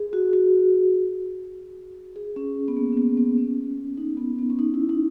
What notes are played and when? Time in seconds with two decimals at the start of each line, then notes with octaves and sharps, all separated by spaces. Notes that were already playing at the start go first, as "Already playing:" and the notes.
Already playing: G#4
0.13 F#4
0.33 F#4
2.16 G#4
2.36 C#4
2.68 B3
2.77 A#3
2.92 C#4
2.97 B3
3.17 B3
3.38 C#4
3.97 D#4
4.17 B3
4.39 B3
4.50 C#4
4.59 D#4
4.74 E4
4.89 D#4